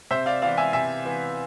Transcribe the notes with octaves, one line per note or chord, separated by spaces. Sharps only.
C3 C5 E5
D5 F5
E3 B3 D5 F5
E5 G#5
C3 E5 G#5
E3 B3